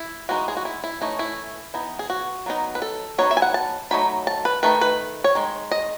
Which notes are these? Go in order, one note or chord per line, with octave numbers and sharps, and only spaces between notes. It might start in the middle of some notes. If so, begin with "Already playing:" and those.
Already playing: E4
E3 G#3 D#4 F#4
G#4
F#4
E4
E4
E3 A3 C#4 D#4
E4
E3 B3 D#4
G#4
F#4
F#3 B3 D#4
B4
A4
F#3 B3 D#4 C#5
E5
G#5
F#5
A5
D#3 F#3 A3 D#4 B5
A5
B4
D#3 A3 D#4 B4
B4
C#5
D#3 G#3
D#5